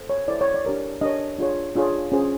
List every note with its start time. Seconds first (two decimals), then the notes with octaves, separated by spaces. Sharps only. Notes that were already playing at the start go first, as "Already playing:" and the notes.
Already playing: A4 C5
0.10 C#5
0.28 E4 A4 C5 D5
0.41 C#5
0.54 D5
0.65 D4 G4 A#4 C#5
1.01 D4 G4 A#4 C#5 D#5
1.38 D4 F4 G#4 C#5
1.75 D4 F4 G#4 C#5
2.12 C#4 F4 G#4 C5